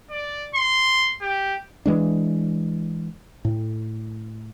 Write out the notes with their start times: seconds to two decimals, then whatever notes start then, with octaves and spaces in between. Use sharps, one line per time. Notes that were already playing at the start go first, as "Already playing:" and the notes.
0.10 D5
0.55 C6
1.21 G4
1.86 E3 G#3 D4
3.45 A2